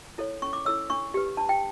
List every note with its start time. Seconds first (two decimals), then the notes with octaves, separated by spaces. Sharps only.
0.18 E4 A4 C#5
0.42 C#4 C#6
0.53 D6
0.65 E4 A4 C#5 E6
0.90 D4 C#6
1.14 G4 B4
1.37 D4 A5
1.49 G5